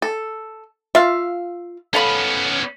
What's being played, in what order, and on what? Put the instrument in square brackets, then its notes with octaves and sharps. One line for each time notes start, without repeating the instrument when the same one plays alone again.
[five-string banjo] A4
[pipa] F4 F5 [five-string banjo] E5
[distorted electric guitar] B3 C#4 [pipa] A4 F5 B5